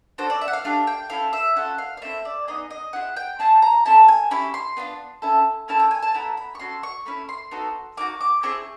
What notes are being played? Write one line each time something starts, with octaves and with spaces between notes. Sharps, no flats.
D4 F#4 A4 C5
D5
E5
F#5
F5
A3 D4 G4 F5
G5
C#4 E4 A4 F5
E5
C#4 F4 A4 F#5
F5
F5
A3 C4 E4 E5
D5
B3 D#4 G#4 D#5
D#5
C4 E4 G#4 F#5
G5
C4 E4 G#4 A5
A#5
A3 C4 E4 A5
G#5
C#4 E4 G4 B5
C6
B3 D4 F4
C#4 E4 A4
A#3 C#4 E4 A4 A5
G5
G#5
A5
B3 E4 A4 A#5
B5
C#6
C#4 F#4 A4 C6
C#6
A3 C#4 E4 B5
C6
B3 D#4 F#4 A4
A#3 D#4 F#4 D6
D6
C4 E4 G#4 C#6